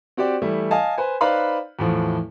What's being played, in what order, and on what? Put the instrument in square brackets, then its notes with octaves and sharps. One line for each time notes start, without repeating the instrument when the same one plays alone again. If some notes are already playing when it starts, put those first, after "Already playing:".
[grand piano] C4 F#4 G4 C5 D5
E3 G3 A3 E4
D#5 F5 G#5 A5
B4 C5 G#5
D#4 B4 C5 D5 F5 B5
E2 A2 F3